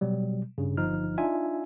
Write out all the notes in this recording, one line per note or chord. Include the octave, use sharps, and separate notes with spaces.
B2 F#3 G3
G2 C#3
G1 F3 D#4 F6
D4 D#4 F4 E5 G#5